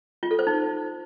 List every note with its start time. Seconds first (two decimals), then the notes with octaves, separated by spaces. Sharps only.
0.23 F4
0.31 A4
0.39 C5
0.47 D#4